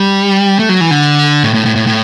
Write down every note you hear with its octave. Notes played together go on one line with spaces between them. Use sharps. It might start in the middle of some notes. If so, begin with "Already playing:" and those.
Already playing: G3
A3
F#3
E3
D3
A2
A2
A2
A2
A2